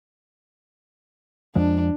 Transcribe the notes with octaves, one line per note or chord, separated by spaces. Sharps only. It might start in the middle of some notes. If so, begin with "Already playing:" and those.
F2 F3 G#3 D4